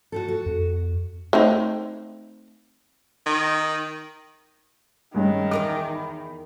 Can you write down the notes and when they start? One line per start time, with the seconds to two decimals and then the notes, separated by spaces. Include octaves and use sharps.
0.12 F#4 G4 A4
0.28 F#4
0.46 F2
1.33 A3 C4 D#4
3.27 D#3
5.14 G2 D#3 G#3 C#4
5.51 E2 A#4 D#5 D6
5.95 B5